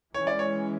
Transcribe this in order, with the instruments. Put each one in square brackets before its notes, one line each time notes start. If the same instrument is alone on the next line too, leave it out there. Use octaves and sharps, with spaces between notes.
[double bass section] E3 G#3 C#4 [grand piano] C#5
[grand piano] D5
C#5